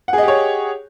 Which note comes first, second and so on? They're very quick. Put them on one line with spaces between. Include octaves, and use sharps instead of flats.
F#5 G#4 D#5 G4 C#5